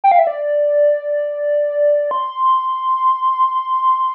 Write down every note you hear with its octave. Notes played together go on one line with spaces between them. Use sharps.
G5
F5
E5
D5
C6